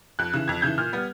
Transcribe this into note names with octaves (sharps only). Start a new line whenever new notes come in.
F2 F#6
C#3 E3
F2 G#6
C#3 E3 G6
A#2 F6
G3 B3